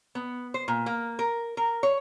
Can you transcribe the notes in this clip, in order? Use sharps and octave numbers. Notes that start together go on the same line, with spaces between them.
B3
C5
A#2
A#3
A#4
A#4
C#5